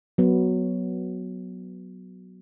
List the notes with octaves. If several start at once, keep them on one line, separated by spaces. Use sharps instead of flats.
F#3 B3